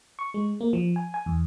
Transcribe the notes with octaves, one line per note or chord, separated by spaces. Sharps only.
C#6
G#3
A#3
F3
G#5
G#5
E2